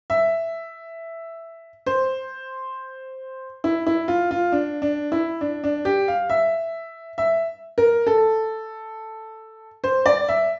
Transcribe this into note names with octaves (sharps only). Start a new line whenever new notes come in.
E5
C5
E4
E4
F4
F4
D4
D4
E4
D4
D4
G4
F5
E5
E5
A#4
A4
C5
D5
E5